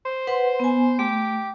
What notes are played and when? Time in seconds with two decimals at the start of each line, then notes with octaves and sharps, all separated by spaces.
0.05 C5
0.27 B4 F#5 C6
0.60 B3 G#5
0.99 A3 G4